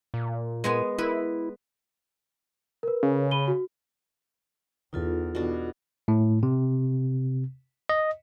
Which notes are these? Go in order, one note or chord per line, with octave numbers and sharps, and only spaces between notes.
A#2
G#3 B3 G#5
E4 B4
A#4 B4
C#3
B5 D#7 G7
F#4
E2 D#4 F4 A4
B2 D4
A2
C3
D#5